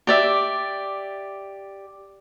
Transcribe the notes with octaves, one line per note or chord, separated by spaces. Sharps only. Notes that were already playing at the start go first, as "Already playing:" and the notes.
G4 D5 E5